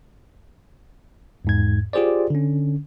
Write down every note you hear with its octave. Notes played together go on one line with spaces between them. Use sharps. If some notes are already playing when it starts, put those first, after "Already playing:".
E2 G#2 G#6
F4 G4 G#4 C5 D5
D3 C#4